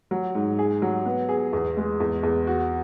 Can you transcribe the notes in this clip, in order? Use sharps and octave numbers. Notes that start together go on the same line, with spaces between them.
F#3
G#2
G#4
F#3
B3
G#4
E2
G#3
E2
E2
F#4